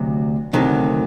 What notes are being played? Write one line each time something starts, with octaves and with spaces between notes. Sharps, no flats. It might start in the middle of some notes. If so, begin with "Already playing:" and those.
Already playing: D2 C3 F#3 D#5
D2 C3 D#3 F#3